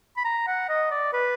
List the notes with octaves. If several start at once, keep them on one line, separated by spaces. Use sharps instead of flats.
B5
A#5
F#5
D#5
D5
B4